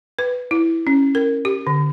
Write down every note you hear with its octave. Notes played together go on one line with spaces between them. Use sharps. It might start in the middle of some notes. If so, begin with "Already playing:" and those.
B4
E4
C#4
A#4
G4
D3